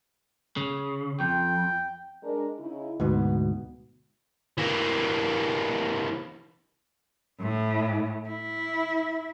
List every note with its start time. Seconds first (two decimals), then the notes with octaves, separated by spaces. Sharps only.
0.57 C#3
1.20 F2 G5
2.23 G#3 D4 A#4
2.59 C#3 D#4 E4
3.00 D2 G#2 B2 B3
4.58 E3 A#3
7.41 A2
8.29 E4